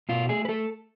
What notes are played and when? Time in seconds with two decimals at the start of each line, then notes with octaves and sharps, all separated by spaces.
0.09 B2 F4
0.29 A3 G#4
0.45 B4
0.49 A3 A4